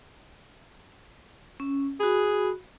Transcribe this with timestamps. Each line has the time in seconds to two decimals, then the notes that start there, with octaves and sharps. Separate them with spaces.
1.60 C#4
2.00 F#4 G#4 B5